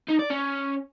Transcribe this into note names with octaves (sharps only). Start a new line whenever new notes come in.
D#4
D5
C#4